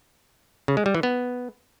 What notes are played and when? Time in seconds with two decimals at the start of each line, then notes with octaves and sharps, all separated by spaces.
0.68 C#3
0.77 G#3
0.86 G3
0.95 E3
1.03 B3